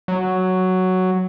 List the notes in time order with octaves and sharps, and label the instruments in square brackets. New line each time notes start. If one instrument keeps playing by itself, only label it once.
[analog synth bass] F#3